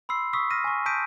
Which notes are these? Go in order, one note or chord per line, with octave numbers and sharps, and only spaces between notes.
B5 C6 E6 C7
C#6 D#6 E6 B6
F6 A#6 D#7
G#5 C#6
A5 D#6 G6 B6 D7 D#7